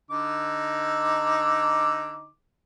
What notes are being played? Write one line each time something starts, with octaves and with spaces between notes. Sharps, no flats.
D3 D#4 D6